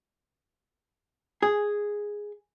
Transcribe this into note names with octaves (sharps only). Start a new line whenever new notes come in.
G#4